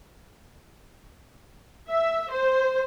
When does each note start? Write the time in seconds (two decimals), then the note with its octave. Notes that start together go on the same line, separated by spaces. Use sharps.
1.88 E5
2.31 C5